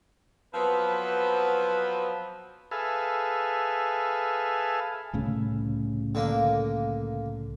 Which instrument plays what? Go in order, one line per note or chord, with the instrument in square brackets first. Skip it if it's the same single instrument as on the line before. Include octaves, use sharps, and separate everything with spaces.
[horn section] F3 F#3 B3 C4 B4
[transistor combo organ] G#4 A4 B4 E5 F5
[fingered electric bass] C2 A2 C#3
[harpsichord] D3 A#3